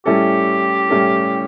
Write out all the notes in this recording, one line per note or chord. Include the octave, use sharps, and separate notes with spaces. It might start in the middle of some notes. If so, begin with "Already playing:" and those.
A2 G3 C#4 E4 G4 A4
A2 G3 C#4 E4 A4